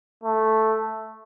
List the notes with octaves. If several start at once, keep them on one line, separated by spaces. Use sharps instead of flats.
A3